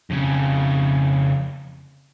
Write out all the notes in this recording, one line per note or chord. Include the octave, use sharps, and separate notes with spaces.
F2 C#3